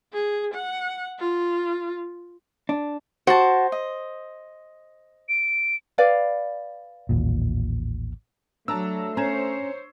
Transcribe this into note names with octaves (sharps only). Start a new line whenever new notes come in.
G#4
F#5
F4
D4
F#4 C5 A5
D#5
D7
B4 D5 F5
A1 D#2 A#2
F#3 A3 D4 A5 A#5 E6
C#4 C5 C#5 A#5 G#6 E7